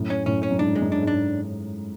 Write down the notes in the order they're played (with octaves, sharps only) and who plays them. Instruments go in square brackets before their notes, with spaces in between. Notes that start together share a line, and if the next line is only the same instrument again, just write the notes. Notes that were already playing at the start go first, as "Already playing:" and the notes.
Already playing: [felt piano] F#2 A2
[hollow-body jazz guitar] C#4
[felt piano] F#2 A2 [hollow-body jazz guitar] C#4
[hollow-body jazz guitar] C#4
[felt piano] F#2
[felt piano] G#2 [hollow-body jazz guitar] D4
[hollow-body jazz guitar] G#3
[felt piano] F#2
[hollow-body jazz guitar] D4
[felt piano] G#2 [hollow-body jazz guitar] D4